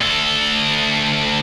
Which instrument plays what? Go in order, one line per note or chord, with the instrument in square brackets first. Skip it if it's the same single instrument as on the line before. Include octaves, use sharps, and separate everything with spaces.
[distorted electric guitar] D2 A4